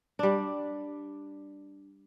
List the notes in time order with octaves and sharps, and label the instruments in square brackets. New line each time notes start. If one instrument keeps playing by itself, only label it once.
[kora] G3 D4